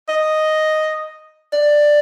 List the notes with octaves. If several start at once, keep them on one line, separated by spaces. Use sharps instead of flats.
D#5
D5